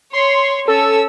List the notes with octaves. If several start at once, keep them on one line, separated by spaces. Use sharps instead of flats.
C#5 C6
C#4 A4 E6